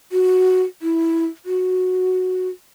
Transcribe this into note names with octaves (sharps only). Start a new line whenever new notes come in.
F#4
E4
F#4